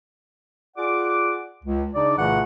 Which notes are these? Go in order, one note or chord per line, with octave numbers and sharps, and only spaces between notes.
F4 G#4 D5 F#5 D6
C#2
C#3 D4 D#4 D5
C2 A#2 C#3 E3 A3 F#5